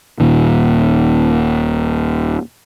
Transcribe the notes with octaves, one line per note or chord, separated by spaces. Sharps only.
D#1 A#2 D#3